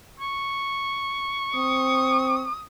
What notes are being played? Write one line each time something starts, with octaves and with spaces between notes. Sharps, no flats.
C#6
C4 D#6